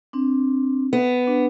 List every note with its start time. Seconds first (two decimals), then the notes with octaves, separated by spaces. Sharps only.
0.13 C4 D4
0.93 B3
1.27 D4